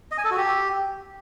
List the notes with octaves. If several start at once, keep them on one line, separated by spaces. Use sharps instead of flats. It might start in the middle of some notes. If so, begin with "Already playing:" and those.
D#5
G#5
A4
F#4
G4